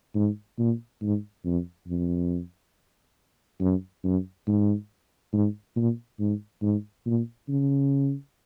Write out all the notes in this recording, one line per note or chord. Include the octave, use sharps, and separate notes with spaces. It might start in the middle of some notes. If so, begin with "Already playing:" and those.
G#2
A#2
G#2
F2
F2
F#2
F#2
G#2
G#2
A#2
G#2
G#2
A#2
C#3